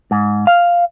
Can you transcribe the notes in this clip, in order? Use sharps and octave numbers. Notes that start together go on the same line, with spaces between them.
G#2
F5